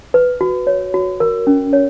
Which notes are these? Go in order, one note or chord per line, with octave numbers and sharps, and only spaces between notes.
B4
F#4
C#5
F#4
A#4
C#4
C#5